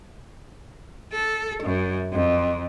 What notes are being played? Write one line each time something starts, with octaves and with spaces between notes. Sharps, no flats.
A4
F#2
F2